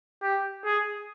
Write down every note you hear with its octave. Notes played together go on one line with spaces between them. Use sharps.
G4
G#4